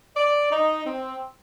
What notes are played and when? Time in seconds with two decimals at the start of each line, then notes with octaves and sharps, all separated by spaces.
0.16 D5
0.51 D#4
0.86 C4